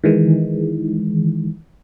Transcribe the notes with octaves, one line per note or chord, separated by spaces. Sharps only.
D#3 E3 G#3